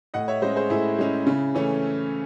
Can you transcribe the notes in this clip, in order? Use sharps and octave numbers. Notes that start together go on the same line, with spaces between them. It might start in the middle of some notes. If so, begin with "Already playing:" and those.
A2 D#5 F#5
C#5 E5
G#3 C#4 C5 D#5
G#4 C5
A2 E4 G#4
G#3 C#4
C#3
E3 A3 C#4